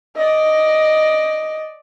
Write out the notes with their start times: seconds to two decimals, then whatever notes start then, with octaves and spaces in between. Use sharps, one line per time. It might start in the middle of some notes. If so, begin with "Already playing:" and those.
0.16 D5 D#5